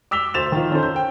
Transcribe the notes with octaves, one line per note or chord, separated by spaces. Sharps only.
D6 E6 B6 F7 G7
D2 C5 A6 E7 F7
D#3 F4
C#4 D#4 A4 C5
G6
G5